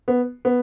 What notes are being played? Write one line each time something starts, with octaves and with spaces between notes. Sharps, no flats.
B3
B3